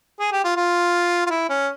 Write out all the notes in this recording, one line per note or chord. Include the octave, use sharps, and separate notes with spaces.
G#4
G4
F4
F4
F4
E4
C#4